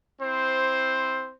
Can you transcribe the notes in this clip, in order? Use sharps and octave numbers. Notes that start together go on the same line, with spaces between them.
C4 E4 C5